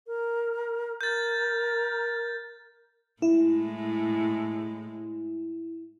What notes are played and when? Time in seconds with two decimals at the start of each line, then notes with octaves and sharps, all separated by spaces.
0.07 A#4
1.01 A#4 G6 A6
3.22 A2 G#3 E4